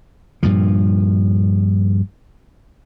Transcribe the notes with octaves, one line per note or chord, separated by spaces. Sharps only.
G2 A#2 F3